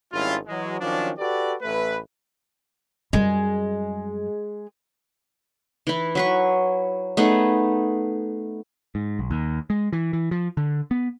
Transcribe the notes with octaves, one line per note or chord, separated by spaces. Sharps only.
G#1 G3 C#4 E4 F4
E3 F#3 G#3
D#3 F3 F#3 C#4 D4
F#4 G4 A4 B4 D5
A1 A3 E4 B4
F#2 G3 G#3
E3 E4
F#3 B4 C#6
A3 B3 D#4 G#4
G#2
B1
D#2
G#3
E3
E3
F3
D3
B3